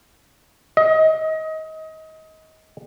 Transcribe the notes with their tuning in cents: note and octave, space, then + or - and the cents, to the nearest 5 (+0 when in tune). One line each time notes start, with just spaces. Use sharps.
D#5 +25